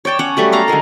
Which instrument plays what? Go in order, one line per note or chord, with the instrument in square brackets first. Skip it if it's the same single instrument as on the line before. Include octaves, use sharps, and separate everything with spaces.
[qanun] C#5 D5 G5 A5
C#4 C#5 F#5
F#3 G3 A3 F#4
A4 F5 A#5
D3 F#3 G#3 A#4